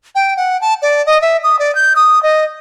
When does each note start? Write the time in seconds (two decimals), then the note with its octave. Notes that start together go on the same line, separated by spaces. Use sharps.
0.15 G5
0.37 F#5
0.61 A5
0.82 D5
1.06 D#5
1.22 E5
1.44 D#6
1.59 D5
1.75 G6
1.96 D#6
2.23 D#5